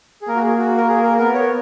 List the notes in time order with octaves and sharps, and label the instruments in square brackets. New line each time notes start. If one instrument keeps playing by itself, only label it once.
[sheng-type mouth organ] G#4
[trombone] A#3 [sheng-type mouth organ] A#4
[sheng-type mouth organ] F#4
G#4
F#4
A#4
G#4
A#4
[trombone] B3 [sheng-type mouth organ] A#4
[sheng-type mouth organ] C#5